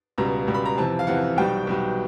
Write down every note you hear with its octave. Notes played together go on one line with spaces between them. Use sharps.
C#2 B2 G3 A#5
C#2 B2 G3
B5
A#5
F2 C3 E3 A5
F5
F2 C3 E3 F#5
B1 B2 G3 G5
B1 B2 G3